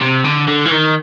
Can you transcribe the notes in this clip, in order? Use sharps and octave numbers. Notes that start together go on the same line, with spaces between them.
C3
D3
D3
E3
D#3